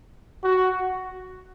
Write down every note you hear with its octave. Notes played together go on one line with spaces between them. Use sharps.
F#4